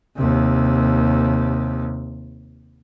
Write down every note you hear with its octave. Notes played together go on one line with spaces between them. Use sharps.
D#2 C3